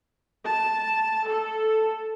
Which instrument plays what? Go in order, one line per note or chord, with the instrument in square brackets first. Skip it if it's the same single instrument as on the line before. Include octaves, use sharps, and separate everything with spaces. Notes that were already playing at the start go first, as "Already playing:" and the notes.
[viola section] A5
A4